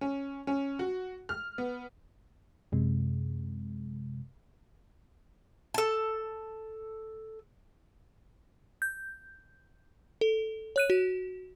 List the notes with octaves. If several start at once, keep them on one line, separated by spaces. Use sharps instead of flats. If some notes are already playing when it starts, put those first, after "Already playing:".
C#4
C#4
F#4
F6
B3
F#2 C3 G#3
A4 A5
G6
A4
C#5 F#6 D#7
F#4